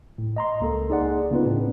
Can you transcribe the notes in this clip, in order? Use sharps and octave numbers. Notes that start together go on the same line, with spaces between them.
A2
D#5 A#5 C6
C#2 A#3 A4
D#4 G#4 D5 F#5
C#3 A#3 B3 D#4 F4 B4
A2 C4 D4